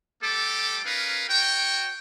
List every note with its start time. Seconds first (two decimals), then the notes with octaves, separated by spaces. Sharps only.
0.23 G3 A3 G4 A4 D6
0.85 C#4 D#4 A#4 B4 F5
1.28 F#4 C#5 G5